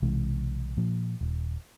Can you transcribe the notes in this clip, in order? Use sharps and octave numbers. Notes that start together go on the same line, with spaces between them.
B1 C3 E3 G#3
A#2 F3
D#1